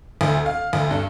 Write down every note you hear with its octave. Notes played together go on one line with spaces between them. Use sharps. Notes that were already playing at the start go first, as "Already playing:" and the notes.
D2
F5
D2
G2